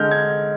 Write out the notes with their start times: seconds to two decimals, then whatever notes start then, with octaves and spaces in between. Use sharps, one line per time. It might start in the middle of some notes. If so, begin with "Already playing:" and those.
Already playing: D3 G#3 F6 G6
0.11 G#6